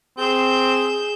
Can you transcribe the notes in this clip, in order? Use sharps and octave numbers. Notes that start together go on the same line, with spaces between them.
C4 G#4 G6 E7